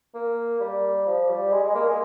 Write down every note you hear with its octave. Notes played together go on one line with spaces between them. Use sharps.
A#3
G3
F3
G3
G#3
G#3
A#3
G#3